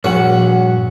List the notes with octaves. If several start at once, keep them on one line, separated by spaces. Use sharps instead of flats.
A#1 G2 F#4 C#5 F#5